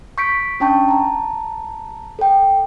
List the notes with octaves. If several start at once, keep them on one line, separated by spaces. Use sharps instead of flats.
C#6 G6 B6 C#7 D7
C#4 D4 G5 A5 C#6 G6
A5 A#5
A4 G5